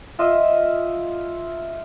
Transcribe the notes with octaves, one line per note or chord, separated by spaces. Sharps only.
F4 D#5 E5